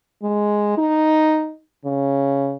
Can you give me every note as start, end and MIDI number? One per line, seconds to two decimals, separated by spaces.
0.23 0.75 56
0.78 1.56 63
1.85 2.56 49